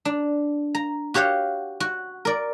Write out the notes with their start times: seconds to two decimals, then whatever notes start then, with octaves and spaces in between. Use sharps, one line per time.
0.05 D4
0.75 A#5
1.14 F#4 G4 C#5 F5 F#5
1.80 F#4
2.25 A#4 D5